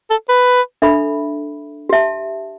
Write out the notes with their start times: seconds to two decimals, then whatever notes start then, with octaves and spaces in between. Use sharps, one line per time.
0.10 A4
0.29 B4
0.82 D4 A4 E5 B5
1.89 G4 E5 A5